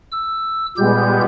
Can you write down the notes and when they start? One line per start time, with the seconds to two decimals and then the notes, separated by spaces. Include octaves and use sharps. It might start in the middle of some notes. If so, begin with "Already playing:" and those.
0.11 E6
0.77 A#2 G3 G#3 B3 G4 G6